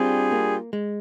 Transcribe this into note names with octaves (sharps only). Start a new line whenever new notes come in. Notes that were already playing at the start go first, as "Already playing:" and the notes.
Already playing: G3 C4 D4 F4 G#4
A#3
G#3